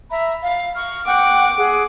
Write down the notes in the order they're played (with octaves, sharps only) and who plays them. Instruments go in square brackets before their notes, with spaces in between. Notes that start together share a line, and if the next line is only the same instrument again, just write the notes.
[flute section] E5 A#5 B5
F5
C#6 F6
[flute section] F#5 G5 C#6 [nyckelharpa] D6
[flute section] G#4 F#5